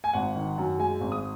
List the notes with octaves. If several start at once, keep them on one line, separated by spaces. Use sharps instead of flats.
G#5
G#1 F#5
D#3
F#2
G#3 G#5
G#1
D#6